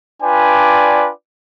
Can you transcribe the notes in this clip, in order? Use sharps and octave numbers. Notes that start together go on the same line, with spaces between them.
D4 F4 B4 D5 G5 G#5